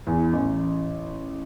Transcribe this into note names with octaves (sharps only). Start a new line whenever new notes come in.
E2
A1